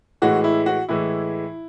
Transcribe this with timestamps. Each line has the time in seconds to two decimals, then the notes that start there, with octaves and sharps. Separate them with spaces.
0.22 A2 E3 G#3 F#4
0.44 E4
0.66 F#4
0.89 A2 E3 G#3 E4